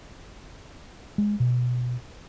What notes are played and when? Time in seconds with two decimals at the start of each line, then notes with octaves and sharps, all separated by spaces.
1.18 G#3
1.40 B2